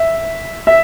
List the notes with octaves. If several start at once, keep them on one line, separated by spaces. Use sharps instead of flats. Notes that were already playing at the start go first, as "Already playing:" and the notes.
Already playing: E5
E5